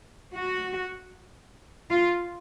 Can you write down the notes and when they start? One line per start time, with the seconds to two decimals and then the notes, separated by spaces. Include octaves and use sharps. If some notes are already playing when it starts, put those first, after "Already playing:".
0.34 F#4
1.90 F4